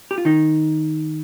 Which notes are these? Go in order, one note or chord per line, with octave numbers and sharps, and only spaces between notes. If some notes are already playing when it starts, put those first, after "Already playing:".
G4
F4
D#3 D#4